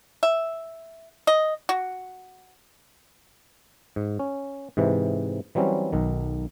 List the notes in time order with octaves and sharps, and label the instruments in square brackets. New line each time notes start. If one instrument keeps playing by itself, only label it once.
[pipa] E5
D#5
F#4
[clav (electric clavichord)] G#2
C#4
G#2 C3 E3
E3 F#3 G3 C4 C#4
B1 D#3